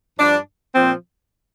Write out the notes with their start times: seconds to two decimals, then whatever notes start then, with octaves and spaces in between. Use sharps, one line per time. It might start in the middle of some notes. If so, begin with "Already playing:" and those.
0.19 G2 F3 D4
0.74 A#2 F3 C4